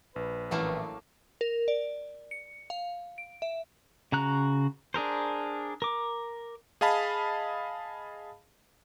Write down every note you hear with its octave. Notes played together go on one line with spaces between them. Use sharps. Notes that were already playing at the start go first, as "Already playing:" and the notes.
A#1 B4
A1 F#3 A3 A#3
A#4
D5
C#7
F5
D7
E5
C#3 F#4 A#5 F#6
D4 G#4 A#4 C5
A#4 D6
G#4 D#5 F5 A5 B5